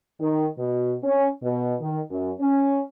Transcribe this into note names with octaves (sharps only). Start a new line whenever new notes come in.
D#3
B2
C#4
B2
D#3
F#2
C#4